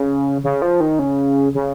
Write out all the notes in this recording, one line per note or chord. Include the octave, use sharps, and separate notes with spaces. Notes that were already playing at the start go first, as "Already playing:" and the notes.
Already playing: C#3
C#3
F3
D#3
C#3
C#3